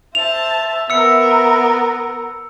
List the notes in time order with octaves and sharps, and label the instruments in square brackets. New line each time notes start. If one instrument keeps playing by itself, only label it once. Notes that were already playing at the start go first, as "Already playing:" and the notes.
[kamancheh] C5 A5 [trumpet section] E5 [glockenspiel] F7
[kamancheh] B3 A#4 [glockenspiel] E6 C#7